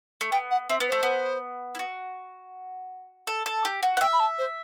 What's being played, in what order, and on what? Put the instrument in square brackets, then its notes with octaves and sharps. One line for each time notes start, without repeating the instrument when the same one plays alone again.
[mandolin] A3
[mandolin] B3 [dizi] G5
[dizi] F#5
[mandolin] C4 [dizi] E5
[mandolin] B3
[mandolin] A3 [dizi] C5
[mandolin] B3
E4
F#4
A4
A4
G4
F#4
F#5
[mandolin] E5 [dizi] G5
[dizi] B5
A5
C5